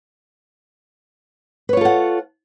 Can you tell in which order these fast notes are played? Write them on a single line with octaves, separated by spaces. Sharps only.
B4 C#5 F4 A4 F#5